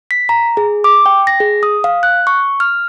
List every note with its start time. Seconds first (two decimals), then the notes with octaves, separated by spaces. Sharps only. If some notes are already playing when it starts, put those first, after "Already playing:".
0.11 B6
0.29 A#5
0.57 G#4
0.84 D6
1.06 G5
1.27 A#6
1.40 G#4
1.63 D#6
1.84 F5
2.03 F#6
2.27 C#6
2.60 F6